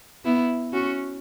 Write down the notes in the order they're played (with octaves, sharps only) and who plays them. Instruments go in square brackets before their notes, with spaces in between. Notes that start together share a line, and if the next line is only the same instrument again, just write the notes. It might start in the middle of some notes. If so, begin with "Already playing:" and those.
[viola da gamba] B3 E4
C#4 F#4